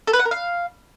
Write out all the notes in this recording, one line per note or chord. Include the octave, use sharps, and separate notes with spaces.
A4
B4
F#5
A#4
F5